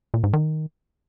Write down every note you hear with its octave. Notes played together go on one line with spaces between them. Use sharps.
A#2
G#2
D#3